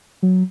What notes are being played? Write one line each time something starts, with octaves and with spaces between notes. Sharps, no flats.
F#3